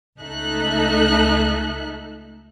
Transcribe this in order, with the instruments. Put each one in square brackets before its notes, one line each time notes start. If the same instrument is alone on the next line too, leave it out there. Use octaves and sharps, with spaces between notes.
[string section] C#2 A3 D#4 A4 E5 F#6